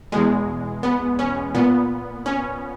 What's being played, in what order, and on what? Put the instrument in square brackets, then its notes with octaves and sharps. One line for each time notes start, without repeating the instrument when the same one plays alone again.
[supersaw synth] E2 B2 G#3
B3
C#4
A#2 B3
C#4